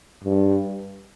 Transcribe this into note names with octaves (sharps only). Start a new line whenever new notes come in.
G2